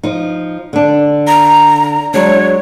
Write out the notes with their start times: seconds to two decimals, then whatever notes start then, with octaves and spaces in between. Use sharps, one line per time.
0.03 F3 D#4
0.73 D3 D4
1.27 A#5
2.14 F#3 G#3 D4 C#5